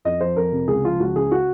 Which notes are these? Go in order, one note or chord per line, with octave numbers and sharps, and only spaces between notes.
F2 D#5
F3 C5
F2 A#4
C3
C#2 G#4
F3 F4
C#2 F#4
C#3 G#4
F#4